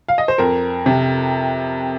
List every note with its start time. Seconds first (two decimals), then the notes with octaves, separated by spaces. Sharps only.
0.09 F5
0.18 D#5
0.28 C5
0.38 F2 A#4
0.86 C3